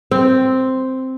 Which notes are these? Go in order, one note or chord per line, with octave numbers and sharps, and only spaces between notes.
C4